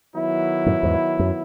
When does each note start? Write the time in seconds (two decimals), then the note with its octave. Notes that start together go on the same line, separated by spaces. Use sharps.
0.13 D#3 F#3 B3 E4
0.66 F#2 A2
0.83 E2 G#2
1.19 F#2